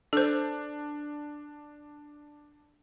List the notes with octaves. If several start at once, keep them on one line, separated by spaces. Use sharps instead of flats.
D4 A4 C5